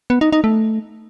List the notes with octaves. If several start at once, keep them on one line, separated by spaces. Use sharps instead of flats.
B3
D#4
D#4
A3